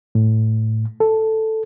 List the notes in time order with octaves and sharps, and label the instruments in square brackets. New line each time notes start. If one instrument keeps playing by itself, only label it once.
[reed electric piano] A2
A4